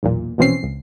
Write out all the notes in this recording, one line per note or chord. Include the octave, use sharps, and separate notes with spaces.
B1 E2 A#2
A#1 B2 E3 C4 C#4 C7
C#2